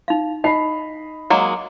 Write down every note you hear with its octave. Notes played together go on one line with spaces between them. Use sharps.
D#4 F5
D#4 D#5 B5 C7
F#3 G#3 A#3